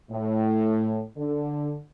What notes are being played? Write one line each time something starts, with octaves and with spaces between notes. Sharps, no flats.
A2
D3